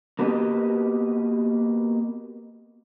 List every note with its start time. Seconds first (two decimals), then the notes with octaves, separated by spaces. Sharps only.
0.19 A#3 B3 F#4 G4 B4 D#5